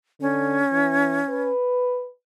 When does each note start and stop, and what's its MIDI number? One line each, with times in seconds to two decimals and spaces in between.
0.21 0.61 50
0.21 1.51 61
0.72 1.20 52
1.29 2.09 71